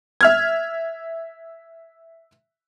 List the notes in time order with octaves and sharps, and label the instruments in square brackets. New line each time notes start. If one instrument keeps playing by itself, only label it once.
[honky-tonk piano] E5 F6 G#6